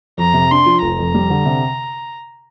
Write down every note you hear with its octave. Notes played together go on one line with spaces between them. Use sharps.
F2 A#5
C3
D4 C6
F3
F1 A#5
F2
G3
D3
C3